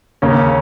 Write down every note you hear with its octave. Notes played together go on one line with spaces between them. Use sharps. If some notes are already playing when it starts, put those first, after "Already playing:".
D#2 C#3 A#3 C#4